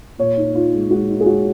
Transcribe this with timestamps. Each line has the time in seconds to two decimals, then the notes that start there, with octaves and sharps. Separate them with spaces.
0.18 A#2 C#5
0.37 D#4
0.54 D#4 F4
0.73 G#3
0.90 G#3 F#4
1.09 D#4
1.21 G#4
1.26 G#3 F#4